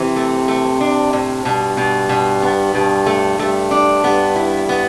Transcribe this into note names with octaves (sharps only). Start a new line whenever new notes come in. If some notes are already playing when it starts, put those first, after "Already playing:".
Already playing: C3 E3
A3
A3
D4
A2
G2 B2
B2
B2
B3
G2 B2
A3
G2 A3
D4
G2 B3
E4
B3